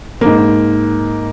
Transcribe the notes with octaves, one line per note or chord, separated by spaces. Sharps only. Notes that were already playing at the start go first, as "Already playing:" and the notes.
G#2 A#3